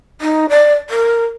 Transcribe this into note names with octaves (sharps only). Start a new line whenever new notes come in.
D#4
D5
A#4